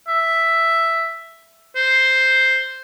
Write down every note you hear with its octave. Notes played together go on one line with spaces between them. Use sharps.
E5
C5